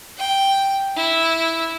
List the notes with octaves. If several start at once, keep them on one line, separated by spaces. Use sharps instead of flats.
G5
E4